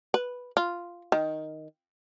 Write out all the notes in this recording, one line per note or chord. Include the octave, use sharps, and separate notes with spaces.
B4
F4
D#3